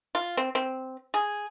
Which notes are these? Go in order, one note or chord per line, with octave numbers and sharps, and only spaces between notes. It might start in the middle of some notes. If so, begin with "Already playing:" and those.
F4
C4
C4
G#4